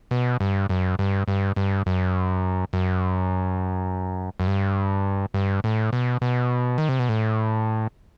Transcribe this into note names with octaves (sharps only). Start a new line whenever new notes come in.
B2
G2
F#2
G2
G2
G2
F#2
F#2
F#2
G2
G2
A2
B2
B2
D#3
C3
B2
A2